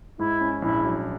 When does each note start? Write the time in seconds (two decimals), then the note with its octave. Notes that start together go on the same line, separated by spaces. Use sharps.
0.18 G#2 E4
0.41 C#4
0.62 A#1 E4
0.85 F#3